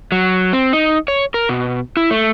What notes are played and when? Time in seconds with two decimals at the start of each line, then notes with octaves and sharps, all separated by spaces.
0.12 F#3
0.53 C4
0.73 D#4
1.08 C#5
1.34 A#4
1.49 B2
1.97 E4
2.11 A3